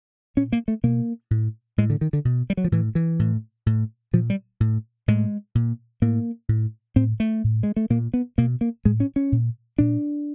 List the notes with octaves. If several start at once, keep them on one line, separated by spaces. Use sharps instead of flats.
A#2 C#4
A#3
A3
B2 A#3
A2
A2 G#3
D3
D#3
D3
B2
G3
F#3
F3
A2 E3
E3
A2
A2
A#2 F3
G3
A2
A2 G#3
A#2
A2 A#3
A2
A2 C4
A3
A2
G#3
A3
A#2 A#3
B3
B2 A#3
A#3
A2 G#3
C#4
C#4
A#2
A#2 D4